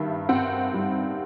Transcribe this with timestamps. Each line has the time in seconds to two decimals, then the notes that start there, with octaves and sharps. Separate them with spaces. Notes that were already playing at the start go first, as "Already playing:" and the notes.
Already playing: G2 D#3 E5
0.29 C4 F#5
0.74 G3